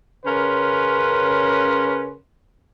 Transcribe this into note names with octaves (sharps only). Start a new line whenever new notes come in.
C#3 C#4 A#4 B4 C6